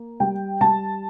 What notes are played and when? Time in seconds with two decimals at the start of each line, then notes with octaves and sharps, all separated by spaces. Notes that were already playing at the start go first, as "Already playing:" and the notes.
Already playing: A#3
0.20 G3 G5
0.61 G3 A5